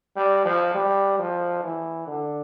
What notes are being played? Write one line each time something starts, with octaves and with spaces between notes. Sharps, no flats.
G3
F3
G3
F3
E3
D3